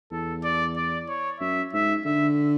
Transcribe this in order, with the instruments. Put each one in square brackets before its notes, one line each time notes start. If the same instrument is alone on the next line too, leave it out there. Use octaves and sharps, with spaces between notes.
[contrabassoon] E2 [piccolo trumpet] A4
[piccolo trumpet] D5
D5
C#5
[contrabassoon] F#2 [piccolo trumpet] E5
[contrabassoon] G#2 [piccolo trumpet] E5
[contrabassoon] D3 [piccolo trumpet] E5